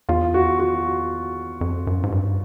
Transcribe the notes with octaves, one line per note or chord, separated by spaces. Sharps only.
E2 F4
F#4
F#4
F2
F#2
G#2
G2